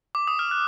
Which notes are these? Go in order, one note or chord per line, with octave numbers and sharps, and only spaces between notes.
D6
D#6
F6
F#6